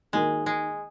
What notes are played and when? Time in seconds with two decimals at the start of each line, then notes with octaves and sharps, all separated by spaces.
0.13 D#3 G#3 A#3 D#4 F#4
0.46 G#3